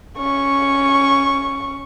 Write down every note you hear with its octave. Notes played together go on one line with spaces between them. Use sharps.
C#4 C#6